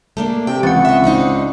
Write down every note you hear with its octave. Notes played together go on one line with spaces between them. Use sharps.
A3 A#3 D4
C3 G5
C#2 E3 C4 F#5
D#5 E5
G#2 D4 D#4